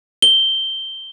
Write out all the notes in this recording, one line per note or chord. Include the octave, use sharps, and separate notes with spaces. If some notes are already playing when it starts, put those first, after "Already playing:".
G7